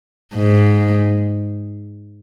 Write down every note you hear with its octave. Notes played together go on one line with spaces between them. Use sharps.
G#2